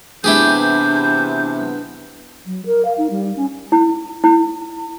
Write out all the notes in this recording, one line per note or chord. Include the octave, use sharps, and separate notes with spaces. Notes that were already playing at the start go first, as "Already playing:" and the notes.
C3 E3 B3 D4 E4 G4 G#4 G6
F#3
A#4
F5
D#4
G3
C#4
E4
E4